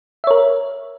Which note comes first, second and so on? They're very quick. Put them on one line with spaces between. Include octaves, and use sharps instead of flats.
E5 C#5 A#4